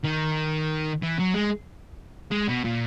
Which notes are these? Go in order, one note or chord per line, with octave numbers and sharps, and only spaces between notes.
D#3
E3
F#3
G#3
G#3
B2
A#2